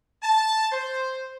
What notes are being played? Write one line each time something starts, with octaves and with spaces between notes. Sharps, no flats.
A5
C5